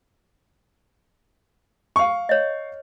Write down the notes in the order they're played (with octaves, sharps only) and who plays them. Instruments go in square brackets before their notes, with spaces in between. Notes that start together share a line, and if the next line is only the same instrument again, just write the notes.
[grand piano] F5 C#6
[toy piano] C#5 D#5